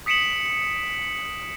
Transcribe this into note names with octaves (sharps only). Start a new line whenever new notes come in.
D#6 B6 C#7 D7 E7 F#7